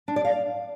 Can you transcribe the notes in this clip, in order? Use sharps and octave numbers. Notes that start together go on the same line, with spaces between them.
D4
D5
F5